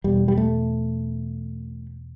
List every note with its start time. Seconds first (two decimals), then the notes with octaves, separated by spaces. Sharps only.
0.04 E2 B2 G3
0.28 G3
0.37 A3